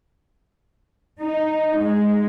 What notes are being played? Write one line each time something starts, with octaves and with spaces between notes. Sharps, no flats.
D#4
G#3